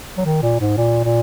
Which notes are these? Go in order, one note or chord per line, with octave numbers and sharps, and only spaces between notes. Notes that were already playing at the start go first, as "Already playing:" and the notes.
F#3
D#3
A#2
G#2
A#2
A#2